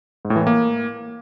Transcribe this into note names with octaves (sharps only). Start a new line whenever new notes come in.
G#2
A2
E3
A2
A#3